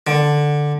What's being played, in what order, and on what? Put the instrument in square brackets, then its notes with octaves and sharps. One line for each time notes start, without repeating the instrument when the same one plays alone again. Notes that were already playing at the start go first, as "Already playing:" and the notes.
[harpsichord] D3